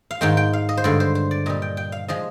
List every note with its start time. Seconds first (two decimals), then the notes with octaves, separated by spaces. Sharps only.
0.11 F5
0.21 G#2 D#3 G#3 G5
0.37 G5
0.53 F5
0.69 D#5
0.77 C5
0.84 G2 D3 G#3 D5
1.00 C5
1.15 C5
1.31 D5
1.46 A#2 G3 D#5
1.62 G5
1.77 G5
1.92 F5
2.08 F3 G#3 D#5